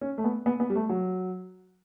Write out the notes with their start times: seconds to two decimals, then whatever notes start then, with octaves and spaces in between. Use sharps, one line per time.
0.01 C#4
0.18 A3
0.24 B3
0.46 B3
0.60 B3
0.70 G3
0.75 A3
0.89 F#3